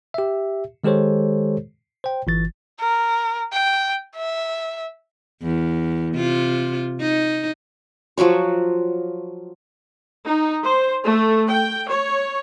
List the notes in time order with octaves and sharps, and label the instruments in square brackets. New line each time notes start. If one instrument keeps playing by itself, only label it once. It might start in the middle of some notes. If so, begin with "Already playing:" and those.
[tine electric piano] G4 E5
D#3 G#3 G4 A4 C5 C#5
C5 G5
G1 E3 A6
[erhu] A#4
G5
E5
[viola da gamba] E2
C3 F4
D#4
[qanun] F3 F#3 F#4 C#5
[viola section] D#4
C5
A3
G5
C#5